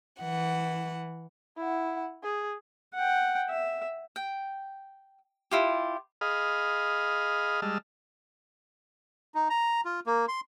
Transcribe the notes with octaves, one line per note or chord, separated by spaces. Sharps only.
E3 F#5
E4 F#5
G#4
F#5 G5
E5
G5
E4 F4 G4
G#4 D#5 F5 B5 D#6 F6
G3 G#3 D#5 A5 E6 F6
D#4
A#5
F4
A#3
C6